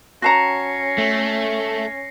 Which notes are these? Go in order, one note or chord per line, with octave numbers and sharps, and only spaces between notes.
C#4 F#4 A5 A#5 A#6 C7 C#7
A3